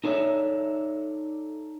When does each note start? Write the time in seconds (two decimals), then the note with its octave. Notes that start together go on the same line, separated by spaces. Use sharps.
0.04 D#4 A4 C#5 D5 E5